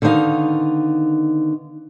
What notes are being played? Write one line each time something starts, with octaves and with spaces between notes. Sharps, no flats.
D3 D#3 B3 D#4 F5